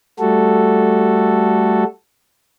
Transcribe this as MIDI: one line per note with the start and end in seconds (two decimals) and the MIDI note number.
0.19 1.84 55
0.19 1.84 57
0.19 1.84 66
0.19 1.84 69